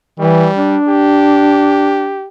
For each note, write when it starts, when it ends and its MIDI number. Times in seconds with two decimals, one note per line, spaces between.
0.19 0.49 52
0.19 0.77 55
0.56 2.18 62
0.88 2.28 67